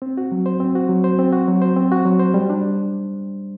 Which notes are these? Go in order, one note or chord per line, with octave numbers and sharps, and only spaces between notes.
C4
F#4
F#3
C5
C4
F#4
F#3
C5
C4
F#4
F#3
C5
C4
F#4
F#3
C5
G3
D4